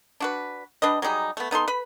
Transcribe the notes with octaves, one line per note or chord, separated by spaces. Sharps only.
D4 F#4 B4
G3 D4 B4 D#5
F#3 G3 D#4 G#4
A3 B3
B3 D#4 A4 C6
B4 B5